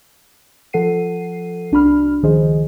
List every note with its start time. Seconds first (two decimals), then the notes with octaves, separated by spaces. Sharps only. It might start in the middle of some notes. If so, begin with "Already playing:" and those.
0.73 F3 A4 F#5 C7 D#7
1.72 C2 D4 F#4 B5 F6
2.23 C#2 D#3 F3 G#4 C5 D#5